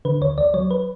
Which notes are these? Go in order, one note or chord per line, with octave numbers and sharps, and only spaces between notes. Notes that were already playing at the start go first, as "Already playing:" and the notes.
D3 B4
D2 C#5
D2 D5
F#3 C#5
B4